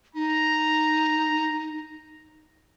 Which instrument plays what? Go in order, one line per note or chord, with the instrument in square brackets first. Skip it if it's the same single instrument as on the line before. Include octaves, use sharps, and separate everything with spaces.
[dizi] D#4 [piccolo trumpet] A#5